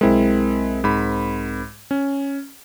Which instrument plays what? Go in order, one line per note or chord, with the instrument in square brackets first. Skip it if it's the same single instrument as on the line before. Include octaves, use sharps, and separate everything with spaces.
[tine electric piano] B1 C4 A#4 [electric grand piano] G#3 E4
[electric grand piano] G#2 B5
C#4